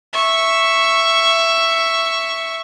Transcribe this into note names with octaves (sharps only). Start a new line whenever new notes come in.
E5 C#6